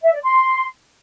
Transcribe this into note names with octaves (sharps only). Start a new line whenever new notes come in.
E5
D5
C6